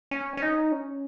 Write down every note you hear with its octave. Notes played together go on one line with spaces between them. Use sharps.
C#4
C#4
D#4
C#4